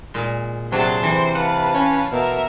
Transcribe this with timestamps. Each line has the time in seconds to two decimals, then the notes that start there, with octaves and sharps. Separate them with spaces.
0.14 A#2 G#3
0.72 C3 F#3 D4 G#4 F#5 A5 C6
1.03 C3 E3 C5
1.35 B4 F5 F#5 A5
1.74 C#4
2.12 B2 A#4 E5